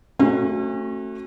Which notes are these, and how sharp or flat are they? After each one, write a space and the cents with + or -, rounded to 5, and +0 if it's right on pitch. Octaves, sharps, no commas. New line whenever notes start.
A3 +10 C#4 -45 F#4 +0